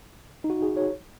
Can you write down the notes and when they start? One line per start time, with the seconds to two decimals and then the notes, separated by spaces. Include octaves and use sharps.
0.44 D#4
0.50 F#4
0.62 G#4
0.77 C#5